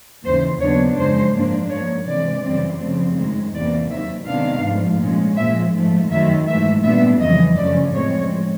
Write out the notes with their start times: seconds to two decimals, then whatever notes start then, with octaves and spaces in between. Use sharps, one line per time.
0.23 D#2 C#3 E3 C5
0.60 D#2 C#3 F#3 B3 D4 C#5
0.97 F#2 C#3 F3 G#3 C5
1.34 G#2 F3 A#3 D4
1.70 G#2 F3 A#3 C#5
2.07 C3 E3 G#3 D5
2.43 F#2 C#3 E3 G3 C4
2.80 C#3 F3 A3 C4
3.17 F#2 D#3 G#3
3.54 E2 C3 E3 G3 A#3 D5
3.90 D#2 D#3 F#3 E5
4.26 C3 D#3 G#3 B3 D4 F5
4.63 G#2 F3 A3
5.00 A#2 F3 G#3 C#4
5.36 A#2 F3 G#3 E5
5.74 G#2 F3 A3
6.10 F#2 D#3 F#3 E5
6.47 G#2 E3 A3 E5
6.83 A#2 G3 B3 D4 E5
7.20 F2 C#3 E3 G3 D#5
7.57 F#2 C#3 F3 A3 C#4 D5
7.93 A2 F3 G#3 C4 C#5